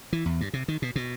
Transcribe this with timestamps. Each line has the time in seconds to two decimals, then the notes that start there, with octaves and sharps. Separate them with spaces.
0.13 E3
0.26 E2
0.41 G2
0.53 C3
0.68 D#3
0.82 B2
0.96 B2